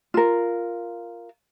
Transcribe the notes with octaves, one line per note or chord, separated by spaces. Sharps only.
F4 A#4